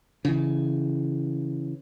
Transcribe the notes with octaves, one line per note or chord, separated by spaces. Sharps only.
C#3 E3